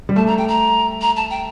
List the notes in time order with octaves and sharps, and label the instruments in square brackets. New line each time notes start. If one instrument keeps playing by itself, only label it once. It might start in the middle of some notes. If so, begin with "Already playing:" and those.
[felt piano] G3
[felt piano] A3 [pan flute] A5
[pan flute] A#5
G5
A#5
A#5
A5
G5